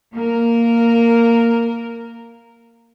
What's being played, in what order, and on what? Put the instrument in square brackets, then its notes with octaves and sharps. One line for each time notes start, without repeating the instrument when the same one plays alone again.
[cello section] A#3 A#4